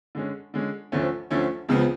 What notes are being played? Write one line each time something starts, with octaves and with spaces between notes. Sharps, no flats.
D3 G#3 C#4
D3 G#3 C#4
D2 D3 F3 A3 C#4
D2 D3 F3 A3 C#4
C#2 C#3 F3 B3